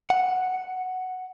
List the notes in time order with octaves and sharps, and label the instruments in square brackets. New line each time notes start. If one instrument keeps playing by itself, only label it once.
[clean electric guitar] F#5